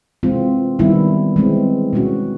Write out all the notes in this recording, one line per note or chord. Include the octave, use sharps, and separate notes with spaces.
C3 E3 G#3 C4 F4
D#3 G3 B3 E4
E3 G#3 C4
B2 G#3 C#4 F#4